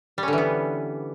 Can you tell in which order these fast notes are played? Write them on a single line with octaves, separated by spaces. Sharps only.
G3 C#4 D3 E3 B3